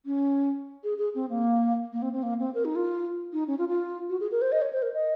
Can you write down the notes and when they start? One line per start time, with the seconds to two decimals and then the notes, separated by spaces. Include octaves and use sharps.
0.06 C#4
0.84 G#4
0.98 G#4
1.15 C4
1.29 A#3
1.93 A#3
2.02 C4
2.13 C4
2.23 A#3
2.39 C4
2.54 A#4
2.65 D#4
2.75 F4
3.33 D#4
3.47 C#4
3.58 F4
3.69 F4
4.09 F#4
4.20 G#4
4.31 A#4
4.41 C5
4.52 D#5
4.62 C#5
4.73 C5
4.82 A#4
4.94 D#5